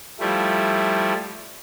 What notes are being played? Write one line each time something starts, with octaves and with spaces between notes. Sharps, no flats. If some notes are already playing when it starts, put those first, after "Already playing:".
F3 G3 A3 E4